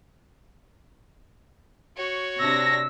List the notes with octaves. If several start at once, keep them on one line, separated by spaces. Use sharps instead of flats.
F#4 C#5
C3 D4 E6 A#6